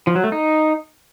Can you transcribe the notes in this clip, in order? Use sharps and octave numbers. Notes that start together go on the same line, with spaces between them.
F3
F#3
A3
D#4